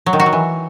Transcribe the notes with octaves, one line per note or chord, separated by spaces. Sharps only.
F#3
D#3
F#4
F#3
E3